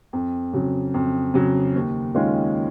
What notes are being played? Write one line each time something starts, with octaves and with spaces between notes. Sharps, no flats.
F2
C#3 F#3
F2
C#3 F#3
D#2
D#3 G#3 C#4 F4